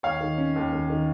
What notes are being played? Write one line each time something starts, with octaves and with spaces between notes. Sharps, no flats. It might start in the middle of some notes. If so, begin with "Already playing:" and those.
D#2 C#5 F5
D#3
C#4
D#2
D#2
D#3